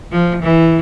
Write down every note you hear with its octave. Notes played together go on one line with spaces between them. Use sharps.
F3
E3